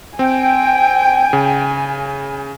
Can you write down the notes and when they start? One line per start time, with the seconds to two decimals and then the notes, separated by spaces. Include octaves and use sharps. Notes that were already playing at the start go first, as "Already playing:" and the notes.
0.19 C4 G5 G#5
1.33 C#3